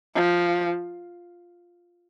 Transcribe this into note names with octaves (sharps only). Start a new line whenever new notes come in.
F3